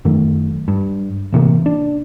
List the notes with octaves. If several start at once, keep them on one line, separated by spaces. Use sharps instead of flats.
F#2 D#3 A3
G2
A2 C3 E3 A#3
D4